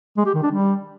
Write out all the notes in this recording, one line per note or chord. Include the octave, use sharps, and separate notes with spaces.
G#3
G4
D#3
D4
G3